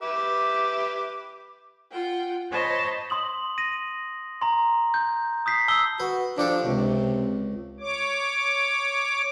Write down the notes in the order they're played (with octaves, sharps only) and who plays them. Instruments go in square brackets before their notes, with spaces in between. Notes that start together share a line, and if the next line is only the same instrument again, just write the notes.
[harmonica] G4 B4 E5 [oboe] D6
[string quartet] F4 F#5 G5
C5 C#5 D#5 A5 B5 C6
[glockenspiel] C6 D#6 F#7
A#6 D#7
A#5 C6
G6
D#6 G6 B6 C7
A5 D#6 E6 G7
[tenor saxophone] F#4 [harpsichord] B4
[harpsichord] F3 G4 A4 [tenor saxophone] D4
[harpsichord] C#2 [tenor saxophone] C3
[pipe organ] C#5 D6